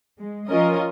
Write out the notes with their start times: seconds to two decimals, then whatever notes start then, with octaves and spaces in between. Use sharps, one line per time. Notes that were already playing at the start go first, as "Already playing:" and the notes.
0.18 G#3
0.49 F3 C#4 F4 A#4 D#5